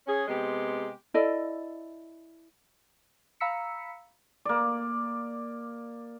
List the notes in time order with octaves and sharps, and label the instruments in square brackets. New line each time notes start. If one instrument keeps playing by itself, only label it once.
[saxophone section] C#4 G#4
C3 G#3 B3 G4
[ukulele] E4 A4 D5 D#5
[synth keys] F5 A#5 B5 E6 B6 C#7
[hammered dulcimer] A#3 D5